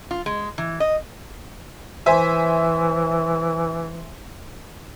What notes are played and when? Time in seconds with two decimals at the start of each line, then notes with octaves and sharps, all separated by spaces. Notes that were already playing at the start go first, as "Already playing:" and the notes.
0.11 F4
0.26 G#3
0.58 E3
0.80 D#5
2.06 E3 C5 E5 G#5